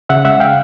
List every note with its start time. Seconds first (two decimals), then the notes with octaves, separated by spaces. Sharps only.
0.09 C#3 E5 F#5
0.25 G#3 E5 F#5
0.40 F5 G5